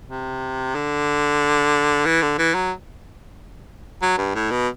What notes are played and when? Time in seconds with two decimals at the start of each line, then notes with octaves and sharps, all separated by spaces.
0.09 C3
0.75 D3
2.05 E3
2.22 D3
2.38 E3
2.54 F#3
4.02 F#3
4.18 G2
4.35 A2
4.51 B2